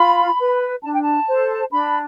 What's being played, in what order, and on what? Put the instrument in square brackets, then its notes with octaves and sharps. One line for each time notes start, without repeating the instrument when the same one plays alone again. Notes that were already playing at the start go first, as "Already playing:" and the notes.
Already playing: [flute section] F4 B5
B4
D4 A5
G5
A5
A4 C5
D4 B5